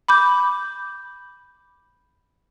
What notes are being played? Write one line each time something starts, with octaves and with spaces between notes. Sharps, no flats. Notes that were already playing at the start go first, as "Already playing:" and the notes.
B5 D6 G6